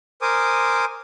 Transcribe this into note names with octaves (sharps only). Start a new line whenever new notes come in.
A#4 C5 G#5 D6 D#6